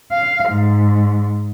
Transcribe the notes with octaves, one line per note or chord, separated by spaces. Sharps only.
F5
G#2